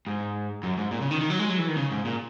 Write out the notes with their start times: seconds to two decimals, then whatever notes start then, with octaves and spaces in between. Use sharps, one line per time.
0.07 G#2
0.63 F#2
0.77 G#2
0.91 A#2
1.01 C#3
1.11 D#3
1.21 D#3
1.30 F#3
1.39 G#3
1.49 F#3
1.59 E3
1.68 D#3
1.77 C#3
1.91 G#2
2.05 A#2